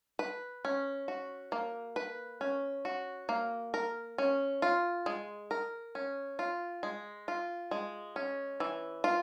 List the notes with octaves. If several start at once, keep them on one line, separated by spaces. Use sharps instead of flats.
B4
C#4
F#4
A#3
B4
C#4
F#4
A#3
A#4
C#4
F4
G#3
A#4
C#4
F4
G#3
F4
G#3
C#4
E3
F4